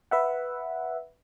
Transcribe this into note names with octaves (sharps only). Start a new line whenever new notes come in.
B4 E5 F#5